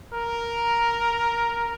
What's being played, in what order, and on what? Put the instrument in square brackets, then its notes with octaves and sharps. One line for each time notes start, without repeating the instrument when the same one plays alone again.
[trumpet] A#4